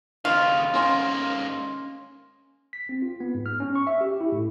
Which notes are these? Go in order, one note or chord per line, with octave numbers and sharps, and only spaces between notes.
D#2 C#3 F4
G#2 A#3 C#4 G#5 C6
B6
C4
F4
B3
G#2
F6
C#4
C#6
E5
G4
E4
A2